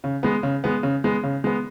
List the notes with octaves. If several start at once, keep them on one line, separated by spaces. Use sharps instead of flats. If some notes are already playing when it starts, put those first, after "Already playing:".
C#3
G#3 B3
C#3
G#3 B3
C#3
G#3 B3
C#3
G#3 B3